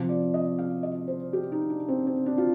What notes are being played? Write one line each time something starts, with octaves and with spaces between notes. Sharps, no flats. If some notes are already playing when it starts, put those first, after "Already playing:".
Already playing: C3 F3
D5
D#5
F5
D#5
C5
G4
D#4
D4
C4
C4
D4
F4